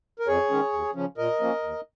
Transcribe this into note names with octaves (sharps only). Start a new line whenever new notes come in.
A#4
F2 G#4 C#5
D#3 G#3 C#4
D#2
C#3 F3 C#4
A#2 A#4 D#5
F3 A#3 C#4
D#2